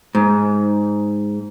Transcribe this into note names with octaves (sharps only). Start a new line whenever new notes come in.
G#2